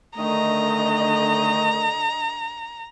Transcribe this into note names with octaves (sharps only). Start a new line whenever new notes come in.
D3 D#3 A3 D#5 A#5